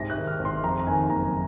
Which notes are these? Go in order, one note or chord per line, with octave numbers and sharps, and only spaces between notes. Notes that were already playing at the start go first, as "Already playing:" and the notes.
Already playing: C2 G#2 A#6
F#6
D#3
F6
G#1
C6
F2 A#5
D#3 G#5
F#1 A#5